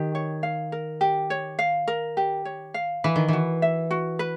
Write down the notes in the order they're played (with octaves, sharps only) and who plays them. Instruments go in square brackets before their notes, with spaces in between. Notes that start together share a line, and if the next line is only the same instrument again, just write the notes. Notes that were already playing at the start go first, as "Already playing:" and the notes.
Already playing: [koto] D#3 [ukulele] G4
[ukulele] C#5
F5
A#4
G4
C#5
F5
A#4
G4
C#5
F5
[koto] E3 [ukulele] B4
[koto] D#3
[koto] E3 [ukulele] F#4
[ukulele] E5
F#4
B4